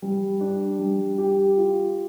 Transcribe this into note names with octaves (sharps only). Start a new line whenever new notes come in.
G3
D4
G3
G4
F4